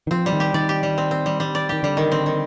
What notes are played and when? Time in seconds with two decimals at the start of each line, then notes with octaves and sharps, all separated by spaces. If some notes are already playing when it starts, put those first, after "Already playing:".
0.07 D#3
0.11 F3 C4
0.26 G3
0.33 D#3
0.40 G4
0.54 D#3 D5
0.69 G4
0.83 G3
0.98 C4
1.11 C4
1.26 G3
1.40 G3
1.55 D5
1.69 D#3 G4
1.83 D3 G3
1.97 D#3
2.12 C4
2.26 D#3